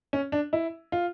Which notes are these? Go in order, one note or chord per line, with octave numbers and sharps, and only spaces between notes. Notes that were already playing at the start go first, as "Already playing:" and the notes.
C#4
D4
E4
F4